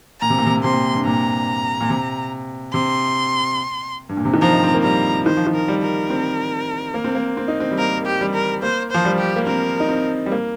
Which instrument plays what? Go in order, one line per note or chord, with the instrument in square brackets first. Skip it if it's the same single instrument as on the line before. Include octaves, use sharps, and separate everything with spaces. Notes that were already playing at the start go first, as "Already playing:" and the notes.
[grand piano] A#2 [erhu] A#5
[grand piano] C3
A#2
C3
A#2
[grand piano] C3 [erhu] C6
[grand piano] A#2
G2
[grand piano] A#2 [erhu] A#5
[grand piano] A#2
C3
[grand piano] C3 [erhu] C6
[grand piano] G2
A#2
C3
D#3
[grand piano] F3 [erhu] A#5
[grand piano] D#4
C4
A#3
[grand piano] G3 [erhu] A#5
[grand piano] D#3 [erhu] C5
[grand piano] F3
D#3
[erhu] A#4
[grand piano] G3
[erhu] A#4
[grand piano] C4
A#3
C4
A#3
C4
D#4
C4
G3
[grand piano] A#3 [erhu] A#4
[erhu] G4
[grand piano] G3
[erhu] A#4
[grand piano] A#3 [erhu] C5
[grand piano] F3 [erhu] C5
[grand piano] G3
[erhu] G4
[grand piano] A#3
[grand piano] C4 [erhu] A#4
[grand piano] D#4
C4
G3
A#3